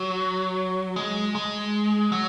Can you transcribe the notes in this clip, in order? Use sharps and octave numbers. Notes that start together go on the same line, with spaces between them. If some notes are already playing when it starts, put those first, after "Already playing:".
Already playing: F#3
G#3
G#3
F#3